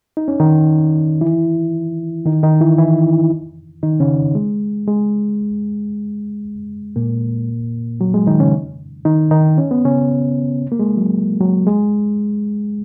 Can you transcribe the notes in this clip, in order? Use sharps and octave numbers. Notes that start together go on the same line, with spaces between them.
D#4
C#4
D#3 D#4
E3 E4
D#3 D#4
D#3 D#4
E3 E4
E3 E4
D#3 D#4
C#3 C#4
G#3
G#3
A#2 A#3
F#3
G#3
D#3 D#4
C#3 C#4
D#3 D#4
D#3 D#4
C#4
B3
C#3 C#4
A#3
G#3
F#3
F#3
G#3